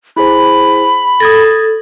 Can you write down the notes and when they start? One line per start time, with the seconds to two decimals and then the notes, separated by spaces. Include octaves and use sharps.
0.17 E4 G#4 C5 B5
1.20 A4 D#6 G#6 A#6